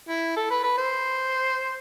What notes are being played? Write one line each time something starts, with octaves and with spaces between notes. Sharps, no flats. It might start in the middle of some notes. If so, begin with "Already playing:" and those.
E4
A4
B4
B4
C5